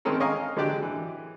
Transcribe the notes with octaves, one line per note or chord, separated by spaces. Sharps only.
D#3 G#3 C4 C#4 A4 A#4
C#5 D#5 F5 G#5 A#5
D3 F#3 G#3 D4 G4 D5
E3